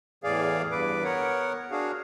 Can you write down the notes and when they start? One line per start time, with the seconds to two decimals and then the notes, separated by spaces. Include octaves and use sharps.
0.24 E2 A2 E3 G#4 D5 F5
0.71 E2 G2 B4 D6
1.04 B3 A#4 C#5 F#5
1.71 D4 F#4 G#4 F5